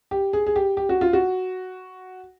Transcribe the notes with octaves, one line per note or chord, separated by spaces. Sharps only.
G4
G#4
G#4
G4
G4
F#4
F4
F#4